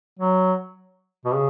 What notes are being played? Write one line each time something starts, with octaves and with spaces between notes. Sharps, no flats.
F#3
B2
C#3